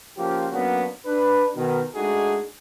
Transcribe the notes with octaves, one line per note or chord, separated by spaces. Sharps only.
C#3 F3 A#3 F4 G4
F#3 A#3 B3 C#4 D4 F#4
D4 B4
B2 D#3
G#3 A3 D4 D#4 F#4 G#4